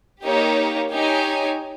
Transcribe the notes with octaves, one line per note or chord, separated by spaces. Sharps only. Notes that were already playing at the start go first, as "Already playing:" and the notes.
A#3 D#4 G4 C#5
D#4 G4 C#5 G#5